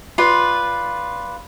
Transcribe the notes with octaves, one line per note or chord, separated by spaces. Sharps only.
F4 B4 D5